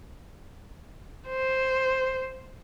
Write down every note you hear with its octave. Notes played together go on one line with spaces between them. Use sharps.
C5